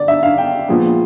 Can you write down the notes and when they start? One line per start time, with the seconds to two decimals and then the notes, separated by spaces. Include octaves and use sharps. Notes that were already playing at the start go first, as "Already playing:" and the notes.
Already playing: D3 D5
0.08 E5
0.23 F5
0.38 G5
0.68 A#2 F3 G#3 B3